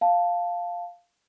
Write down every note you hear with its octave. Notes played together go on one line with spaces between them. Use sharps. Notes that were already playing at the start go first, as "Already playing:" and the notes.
F5 A5